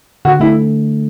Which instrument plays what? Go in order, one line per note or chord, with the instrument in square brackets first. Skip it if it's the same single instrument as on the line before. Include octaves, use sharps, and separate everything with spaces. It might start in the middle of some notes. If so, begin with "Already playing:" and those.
[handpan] D3 [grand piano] F#4
[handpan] A3 [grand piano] E4